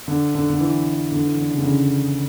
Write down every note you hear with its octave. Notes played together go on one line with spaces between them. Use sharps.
D3
D3
D3
E3
D3
E3
D3
C#3
D3
C#3